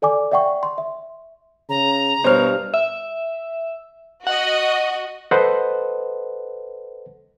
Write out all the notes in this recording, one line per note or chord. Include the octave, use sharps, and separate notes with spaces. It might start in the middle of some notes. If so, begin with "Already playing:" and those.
A4 D5 G#5 D6
D5 E5 F#5 G5 C#6
C6
E5
C#3 A#5
G2 B2 C5 C#5 F6
E5
F#4 D#5 F#5
A4 B4 C5 D#5 F#5